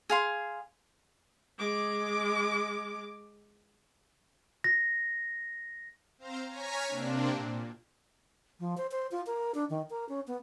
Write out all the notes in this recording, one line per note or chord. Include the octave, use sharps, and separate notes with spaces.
G#4 F5 C6
G#3 D6
A#6
C4 C5 F5 A#5
C#5 G#5 A#5 F6 B6
C3 A#3 C4 D4
A#2
F3
C5
C5
F4
A#4
D4
D#3
A#4
C#4
B3